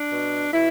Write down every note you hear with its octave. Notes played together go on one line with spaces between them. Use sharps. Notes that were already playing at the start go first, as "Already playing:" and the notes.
Already playing: D4
B2
B2 E4